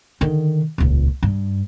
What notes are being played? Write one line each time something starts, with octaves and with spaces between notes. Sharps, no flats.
D3 D#3
D#1 C#2
G2